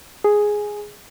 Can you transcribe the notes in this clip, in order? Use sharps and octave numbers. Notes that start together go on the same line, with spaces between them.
G#4